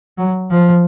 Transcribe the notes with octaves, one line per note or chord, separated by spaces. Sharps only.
F#3
F3